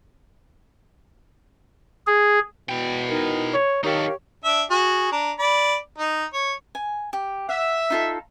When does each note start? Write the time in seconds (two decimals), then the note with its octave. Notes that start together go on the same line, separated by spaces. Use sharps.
2.07 G#4
2.69 B2 E4 G5
3.08 D#4 A#4
3.54 C#5
3.84 D#3 D#4 G4 A4 A#4 C#5 F5
4.44 D4 E5
4.70 F#4 G#4
5.12 D4 A#5
5.39 D5 B5
5.98 D#4
6.33 C#5
6.75 G#5
7.13 G4
7.49 E5 F#5
7.90 D#4 F4 A4